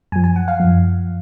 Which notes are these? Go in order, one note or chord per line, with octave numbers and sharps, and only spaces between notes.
F#2 F3 G#5
G#5
F#5
F5
F#2 F3